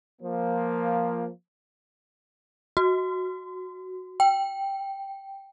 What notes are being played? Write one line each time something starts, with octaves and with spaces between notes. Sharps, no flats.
F3 A#3
F#4
G5